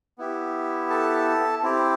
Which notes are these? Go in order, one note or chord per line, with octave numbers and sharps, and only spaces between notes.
B3 E4 G4
A4 A5
C4 E4 G4